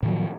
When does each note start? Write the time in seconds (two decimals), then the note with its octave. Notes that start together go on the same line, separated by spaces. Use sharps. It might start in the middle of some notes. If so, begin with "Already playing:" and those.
0.03 A2
0.05 D#3
0.08 F#3
0.10 F3